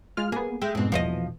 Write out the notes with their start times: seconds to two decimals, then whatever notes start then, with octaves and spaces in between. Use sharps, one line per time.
0.17 G#3 F4 F6
0.32 A#3 B3 G#4
0.62 G#3 E5 G5
0.75 F2 G#2 B2 C4
0.92 A#1 E2 B2 F3 C5 D#5